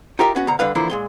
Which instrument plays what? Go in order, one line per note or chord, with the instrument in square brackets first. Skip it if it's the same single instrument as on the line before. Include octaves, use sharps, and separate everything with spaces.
[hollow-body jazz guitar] D#4 F4 G4 A#4 E5
B3 C#4 F#4
D2 B2 A#5
D3 G3 B4 F5
D3 E3 F3 A#3 E4
A#2 G#3 C6